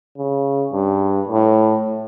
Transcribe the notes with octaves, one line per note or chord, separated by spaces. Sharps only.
C#3
G2
A2